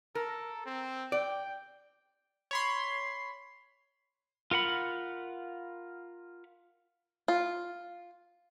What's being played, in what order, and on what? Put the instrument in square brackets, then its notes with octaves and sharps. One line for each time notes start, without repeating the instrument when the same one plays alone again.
[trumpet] A4 [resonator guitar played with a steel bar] A#4
[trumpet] C4
[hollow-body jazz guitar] D5 [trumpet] G5
[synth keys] C#5 B5 C6
[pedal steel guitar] F4 A#4 F#5 B5
[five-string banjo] F4